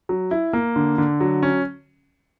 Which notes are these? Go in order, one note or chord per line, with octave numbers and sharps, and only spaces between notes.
F#3
E4
A#3
D3
D3
F#3
C#4